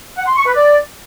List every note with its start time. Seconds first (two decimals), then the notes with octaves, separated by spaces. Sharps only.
0.17 F#5
0.26 C6
0.36 C#6
0.45 B4
0.55 D5